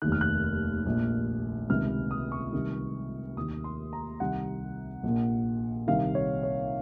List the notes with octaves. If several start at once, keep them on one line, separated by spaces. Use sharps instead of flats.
F1 D#2 D#3 F#6
F6
F#6
A#1 A#2
C#2 C3 D#3 F6
D#6
C#6
C2 C3 D#3
D#2 D#3 D#6
C6
A#5
C2 C3 D#3 F#5
A#1 A#2
C2 C3 D#3 F5
C#5
C#5